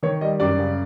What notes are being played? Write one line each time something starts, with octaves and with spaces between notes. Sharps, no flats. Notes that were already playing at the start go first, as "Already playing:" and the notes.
D#3 C#5
G3 D#5
F#2 D5
C#3